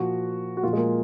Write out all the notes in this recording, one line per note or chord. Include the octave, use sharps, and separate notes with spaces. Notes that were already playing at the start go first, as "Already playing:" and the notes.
Already playing: A#2 F3 F#4
F#4
A#2 F3 F4
G#3
A#3